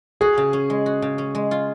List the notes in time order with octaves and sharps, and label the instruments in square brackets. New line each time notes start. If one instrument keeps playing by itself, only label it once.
[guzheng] F#4 [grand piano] G#4
[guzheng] C#3
C#4
G#3
F#4
C#3
C#4
G#3
F4